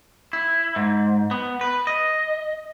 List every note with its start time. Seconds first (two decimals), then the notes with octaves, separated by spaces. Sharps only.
0.33 E4
0.76 G#2
1.31 B3
1.61 B4
1.87 D#5